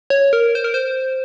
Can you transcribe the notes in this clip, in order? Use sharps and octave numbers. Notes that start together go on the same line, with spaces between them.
C#5
A#4
C5
A#4
C5